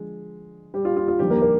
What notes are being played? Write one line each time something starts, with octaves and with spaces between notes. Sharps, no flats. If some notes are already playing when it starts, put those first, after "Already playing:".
Already playing: D3 F3 G#3
G3 G4
F4
F4
F4
D#2 D3 F3 G3 G4
A#3 A#4
A#3 A#4